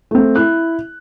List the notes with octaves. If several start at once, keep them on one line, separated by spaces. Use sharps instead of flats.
A3 C4
E4 F#6